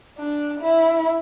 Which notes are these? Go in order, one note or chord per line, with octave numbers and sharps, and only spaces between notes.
D4
E4